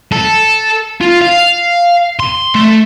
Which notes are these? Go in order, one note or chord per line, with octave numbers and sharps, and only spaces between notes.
A4
F4
F5
C6
A3